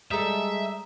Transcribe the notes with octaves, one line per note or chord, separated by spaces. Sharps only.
G3 G#3 A4 E5 A#5 D#6 B6